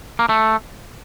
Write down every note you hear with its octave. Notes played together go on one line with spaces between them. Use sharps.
A#3
A3